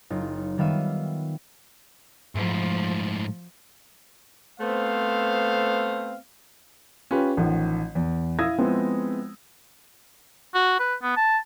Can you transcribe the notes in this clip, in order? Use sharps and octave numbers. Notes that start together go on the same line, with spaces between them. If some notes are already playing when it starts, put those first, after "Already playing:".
F#1 D#4 F4
D#3 G3 B3 E5 F5 D#7
G#2 F3 A3
A3 B3 C4 C5 F5
C#4 F4 G4 B4
A1 D#3 F3 F#5
E2
E4 F5 D#6 E6 G#6 A#6
F3 G#3 B3 C4 E4
F#4
B4
B3
A5